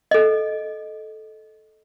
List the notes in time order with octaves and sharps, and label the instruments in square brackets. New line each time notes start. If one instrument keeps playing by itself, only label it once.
[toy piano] A4 D#5